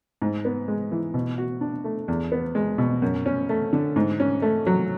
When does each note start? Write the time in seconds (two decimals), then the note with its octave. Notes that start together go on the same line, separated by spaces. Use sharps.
0.22 G#2
0.45 B3
0.68 G#3
0.92 E3
1.14 B2
1.38 F#4
1.61 D4
1.84 A3
2.08 E2
2.32 B3
2.55 G#3
2.78 B2
3.02 F#2
3.26 C#4
3.49 A3
3.73 D3
3.96 G#2
4.20 C#4
4.42 A3
4.67 F#3